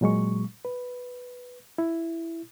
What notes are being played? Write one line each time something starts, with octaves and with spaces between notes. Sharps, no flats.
A#2 F#3 G#3 C#6
B4
E4